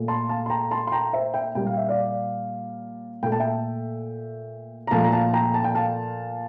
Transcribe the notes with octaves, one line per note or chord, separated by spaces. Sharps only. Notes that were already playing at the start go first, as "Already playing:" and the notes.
Already playing: A#2 A3
A5 C6
F5 A5
C6
G5 A#5
A5 C6
C6
G5 A#5
C5 E5
E5 G5
A#2 G3 A#3 G5
F5
E5
D5 F5
A#2 A3 G5
A5
E5 G5
A#5
A#2 F3 A3 F5 A5
A#5
F5 A5
G5 A#5
A5
G5
F5 A5